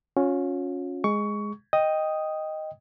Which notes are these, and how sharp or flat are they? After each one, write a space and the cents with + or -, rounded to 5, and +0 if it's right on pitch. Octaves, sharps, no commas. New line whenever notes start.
C#4 +0 F4 +45
G#3 +0 C#6 +20
D#5 +0 G5 +0 D#6 +0